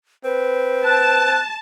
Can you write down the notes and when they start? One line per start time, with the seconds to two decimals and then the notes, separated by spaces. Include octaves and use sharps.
0.25 C4 B4
0.84 A5 F#6